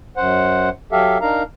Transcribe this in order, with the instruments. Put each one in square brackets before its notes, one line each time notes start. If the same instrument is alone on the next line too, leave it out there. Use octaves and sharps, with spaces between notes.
[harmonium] F#2 C5 F#5
F#3 G4 A4 E5 F5
D4 D#4 A#4 F5 A#5